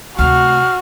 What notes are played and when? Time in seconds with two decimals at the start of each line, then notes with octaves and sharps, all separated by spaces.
0.19 D2 C3 F#4 F6